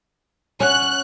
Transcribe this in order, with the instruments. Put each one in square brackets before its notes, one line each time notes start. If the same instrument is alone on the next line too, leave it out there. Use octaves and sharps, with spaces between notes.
[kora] C#4 F#5 [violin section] F#6